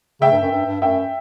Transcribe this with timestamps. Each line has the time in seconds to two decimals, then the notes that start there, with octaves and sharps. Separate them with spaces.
0.21 C#3 E5 G5
0.32 G2
0.42 F#2
0.51 G2
0.66 G2
0.81 F#2 E5 G5